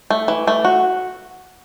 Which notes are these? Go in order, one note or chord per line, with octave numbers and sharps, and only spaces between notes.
A3
E3
A3
F#4